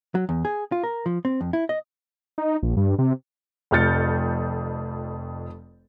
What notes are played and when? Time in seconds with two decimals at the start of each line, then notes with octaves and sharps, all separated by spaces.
0.15 F#3
0.29 E2
0.45 G#4
0.72 F4
0.84 A#4
1.06 F3
1.25 C4
1.41 F2
1.53 E4
1.69 D#5
2.38 D#4
2.63 A#1
2.77 G2
2.98 C3
3.71 F1 F2 F6 G6 A6 C#7